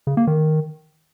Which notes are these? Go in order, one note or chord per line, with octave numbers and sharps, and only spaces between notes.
C#3
A#3
D#3